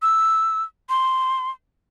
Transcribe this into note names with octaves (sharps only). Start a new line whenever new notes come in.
E6
C6